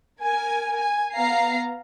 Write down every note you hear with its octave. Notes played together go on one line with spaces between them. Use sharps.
A#4 G#5
G#5
B3 F5 A#5 C7